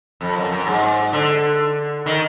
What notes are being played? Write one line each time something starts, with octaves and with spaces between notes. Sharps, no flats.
F2
F#2
F#2
G#2
D3
D#3